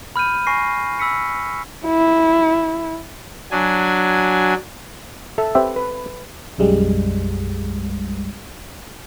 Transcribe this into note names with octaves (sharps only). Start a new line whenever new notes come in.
B5 F6 G6 D#7
G#5 C#6 A#6 C7
B5 E6 B6 C#7
E4
F#3 D4 G#5
A4 E5
C4 G4 B4 E5
B4
B1 F#2 G3 G#3